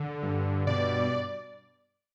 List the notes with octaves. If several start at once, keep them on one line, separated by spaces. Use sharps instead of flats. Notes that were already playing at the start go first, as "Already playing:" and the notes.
Already playing: D3
G2
B2 D5